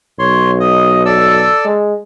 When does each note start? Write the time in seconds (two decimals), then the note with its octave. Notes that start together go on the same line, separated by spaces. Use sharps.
0.19 B1 C#5 C6
0.60 D#5
1.05 A4 D5 E6
1.65 G#3